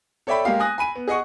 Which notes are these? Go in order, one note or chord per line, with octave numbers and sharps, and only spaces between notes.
A4 C#5 D5 E5 G5 B5
G#3 A#3 G4 F5
G#5 D#6 F#6 A#6
G#5 B5 D#7
B3
G#4 D#5 F#5 C#6